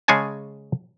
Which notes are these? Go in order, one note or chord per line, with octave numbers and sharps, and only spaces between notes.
C#3 G#3 G#4 C#5 G#5 A5